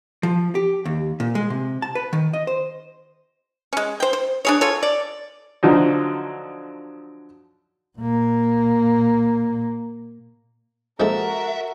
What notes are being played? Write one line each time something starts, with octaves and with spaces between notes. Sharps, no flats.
F3
G4
D#2
A#2
G#3
C3
A5
B4
D#3
D#5
C5
G#3 C#4
C5 G5
C5
D4 G#4 C#5
F4 A4 C#5
D5
D3 F3 F#3 D#4
A#2 A#3
F3 G#3 A#3 F#4 A4 A#4 E5